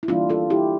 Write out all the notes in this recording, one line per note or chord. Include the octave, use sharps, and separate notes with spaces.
E4
E3 G3 A#3 D4 F4
F4 A4
E4 G4